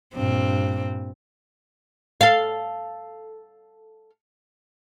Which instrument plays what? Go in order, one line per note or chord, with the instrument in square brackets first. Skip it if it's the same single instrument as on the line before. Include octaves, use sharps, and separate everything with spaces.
[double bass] G2 A#2 [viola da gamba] C4
[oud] A4 F5